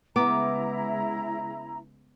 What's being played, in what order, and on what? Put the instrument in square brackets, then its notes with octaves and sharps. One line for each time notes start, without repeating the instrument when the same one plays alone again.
[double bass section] C#3 G#3 [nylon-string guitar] B3 [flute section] E4 A#5 [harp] D6